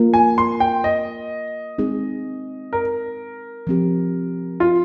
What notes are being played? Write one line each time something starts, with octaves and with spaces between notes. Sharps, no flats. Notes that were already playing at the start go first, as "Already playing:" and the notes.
Already playing: A#3 F4 A#4
G#5
C6
G5
D#5
G#3 C4 D#4 G#4
A#4
F3 C4 G4
F4